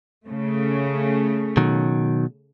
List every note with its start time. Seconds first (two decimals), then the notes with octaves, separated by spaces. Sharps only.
0.24 C#3 A3
1.57 B2 D#3 F#3